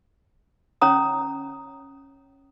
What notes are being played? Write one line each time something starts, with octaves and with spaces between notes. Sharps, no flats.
C#4 C#5 A#5 D#6